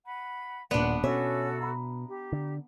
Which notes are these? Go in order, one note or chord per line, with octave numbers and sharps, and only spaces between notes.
F#5 B5
D#1 B3 D4 D5 F#5 C6
B2 C#4 F#4 A4 E5 E6
A#5 B5
G4
D3